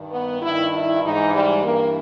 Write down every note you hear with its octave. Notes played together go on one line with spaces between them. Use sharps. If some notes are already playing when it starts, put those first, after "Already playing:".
Already playing: G2 D#3
B3
G2 D#3 E4
E4
G#2 E3 D#4
G3
G2 E3 A#3